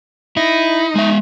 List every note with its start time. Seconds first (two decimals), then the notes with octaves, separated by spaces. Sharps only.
0.37 D#4 E4
0.95 G#3 E5